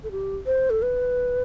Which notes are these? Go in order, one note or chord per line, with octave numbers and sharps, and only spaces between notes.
A4
G4
C5
A4
B4